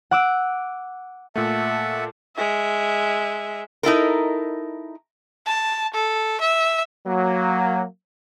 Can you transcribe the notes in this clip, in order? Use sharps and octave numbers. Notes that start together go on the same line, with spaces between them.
F#5 D6 E6
A#2 A3 E5 F#5 A5
G#3 E5
D#4 E4 A4 A#4
A5
A4
E5
F#3 A#3